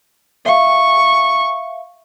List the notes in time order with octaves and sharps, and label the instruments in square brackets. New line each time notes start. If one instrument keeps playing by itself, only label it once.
[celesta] E5 F5 [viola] C#6